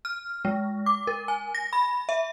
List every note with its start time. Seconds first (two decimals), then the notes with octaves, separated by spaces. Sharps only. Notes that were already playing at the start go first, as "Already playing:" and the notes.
0.05 F6
0.45 G#3
0.86 D6
1.07 A#4
1.28 G#5
1.55 A#6
1.73 B5
2.09 E5